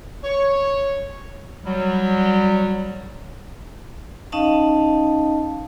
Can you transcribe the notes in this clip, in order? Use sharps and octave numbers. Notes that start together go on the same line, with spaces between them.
C#5
F#3 G3
C#4 D#4 D#5 F5 A5